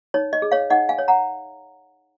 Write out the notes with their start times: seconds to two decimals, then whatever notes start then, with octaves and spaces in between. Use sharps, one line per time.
0.14 D#4 C#5
0.33 D#5
0.42 G#4
0.52 C#5 F5
0.70 D#4 D#5 F#5
0.89 F5 G#5
0.99 C#5
1.08 F#5 A#5